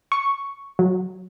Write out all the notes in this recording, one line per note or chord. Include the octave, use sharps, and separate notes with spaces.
C#6
F#3